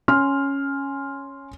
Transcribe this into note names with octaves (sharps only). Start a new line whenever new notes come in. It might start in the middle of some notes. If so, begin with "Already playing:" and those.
C#4 G#5 C6 F6